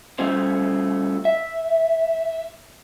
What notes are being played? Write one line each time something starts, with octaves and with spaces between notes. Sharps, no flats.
G3 A3 C#4 F4 C5
E5